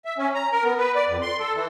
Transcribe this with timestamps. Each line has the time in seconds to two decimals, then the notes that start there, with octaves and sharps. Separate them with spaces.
0.05 E5
0.18 C#4
0.35 A#5
0.52 A#4
0.64 B3
0.78 B4
0.95 D5
1.07 F2
1.22 C6
1.40 A4
1.55 E3